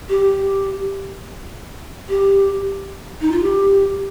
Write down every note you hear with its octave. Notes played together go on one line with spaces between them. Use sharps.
G4
G4
D#4
F4
G4